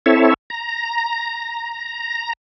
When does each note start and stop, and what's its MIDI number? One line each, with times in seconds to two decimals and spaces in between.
0.06 0.34 60
0.06 0.34 64
0.06 0.34 69
0.06 0.34 73
0.06 0.34 76
0.50 2.33 82